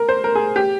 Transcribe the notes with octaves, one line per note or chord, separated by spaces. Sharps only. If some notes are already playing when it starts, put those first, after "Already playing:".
Already playing: A#4
C5
A#4
G#4
G4